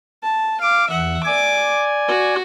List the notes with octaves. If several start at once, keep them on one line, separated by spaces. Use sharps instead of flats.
A5
F5 D6
E2 E5 F#5
D5 G#5 D6
F#4